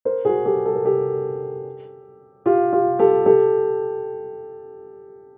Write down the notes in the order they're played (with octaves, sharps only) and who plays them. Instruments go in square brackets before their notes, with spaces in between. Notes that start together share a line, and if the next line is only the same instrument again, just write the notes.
[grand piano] A#4 C5
F#4 G#4
G4 A4
A4
A#4
G4 A4
F4 G4
F4 G4
G4 A4
G4 A4